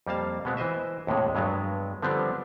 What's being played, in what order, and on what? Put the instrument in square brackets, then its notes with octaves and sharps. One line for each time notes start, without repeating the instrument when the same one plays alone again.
[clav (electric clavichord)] F2 G3 A#3 F5 A5
B2 G#3 B3 C4
E3 C5 D#5 E5
D#2 A2 C3 G#3
G2 F#3 G#3 B3
D3 F3 G3 B3 C4 D4